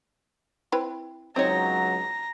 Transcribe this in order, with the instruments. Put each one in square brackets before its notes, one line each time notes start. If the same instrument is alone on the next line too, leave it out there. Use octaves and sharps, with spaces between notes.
[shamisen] C4 E4 B4
[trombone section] C#2 F#3 [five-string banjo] C4 D#4 C#5 [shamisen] C5 D#5 [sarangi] A#5